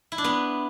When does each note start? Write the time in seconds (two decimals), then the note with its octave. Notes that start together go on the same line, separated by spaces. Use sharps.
0.12 E4
0.18 D4
0.24 B3